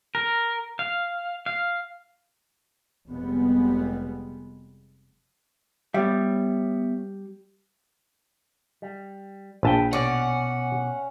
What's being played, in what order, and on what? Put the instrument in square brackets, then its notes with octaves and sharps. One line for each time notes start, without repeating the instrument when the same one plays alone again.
[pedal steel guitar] A#4
F5
F5
[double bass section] F1 G3 G#3 B3
[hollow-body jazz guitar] G3 [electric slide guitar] B3 C#5 E5
[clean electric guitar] G3
[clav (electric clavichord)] A#1 A5 [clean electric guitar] B4 G5
[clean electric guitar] B2 D5 [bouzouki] C#4 [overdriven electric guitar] F#5